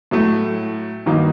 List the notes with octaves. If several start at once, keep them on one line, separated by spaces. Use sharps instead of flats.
A2 F#3 A3
G2 D#3 F#3 A#3 D#4